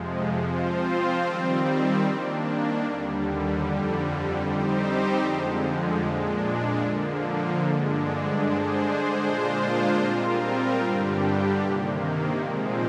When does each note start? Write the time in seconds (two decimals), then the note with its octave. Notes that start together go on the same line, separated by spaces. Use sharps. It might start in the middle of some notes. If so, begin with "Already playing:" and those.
Already playing: F2 C3 F3 G#3
0.45 F3 C4 F4 C5
1.24 D#3 G3 C4
2.04 D#3 A#3 D4
2.84 D#2 D3 G3
3.63 F2 D3 G3
4.43 G3 C4 D#4 G4 C5
5.23 F2 D3 F3 G#3
6.03 A#2 G#3 D4
6.82 D3 F3 A#3
7.62 G2 D3 G#3 D4
8.42 D3 G#3 D4 G#4 C5
9.21 A#2 G#3 D4 F4 C5
10.01 G3 C4 F4 A#4
10.81 G2 D3 G3 D4 G4
11.61 C3 D#3 A#3
12.40 A#2 F3 G#3 C4